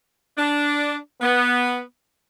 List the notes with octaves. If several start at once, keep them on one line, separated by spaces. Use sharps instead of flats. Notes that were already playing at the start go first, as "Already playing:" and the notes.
D4
B3